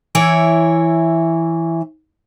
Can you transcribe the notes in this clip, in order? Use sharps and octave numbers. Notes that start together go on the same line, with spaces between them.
E3 E4 C#5